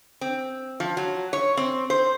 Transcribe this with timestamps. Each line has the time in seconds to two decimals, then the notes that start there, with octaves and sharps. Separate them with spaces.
0.21 C4
0.80 F3
0.97 F#3
1.33 C#5
1.57 C4
1.90 C5